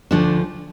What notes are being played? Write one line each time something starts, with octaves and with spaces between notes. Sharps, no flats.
D2 D3 F3 D4